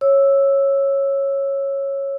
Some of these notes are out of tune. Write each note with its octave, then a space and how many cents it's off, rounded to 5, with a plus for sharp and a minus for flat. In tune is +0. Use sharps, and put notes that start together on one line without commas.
C#5 -10 E6 +0